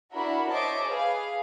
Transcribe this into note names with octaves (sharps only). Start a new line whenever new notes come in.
D4 E4 F#4 A#4 B5
C5 C#5 D#5 E5 A5 D6
G#4 B4 F5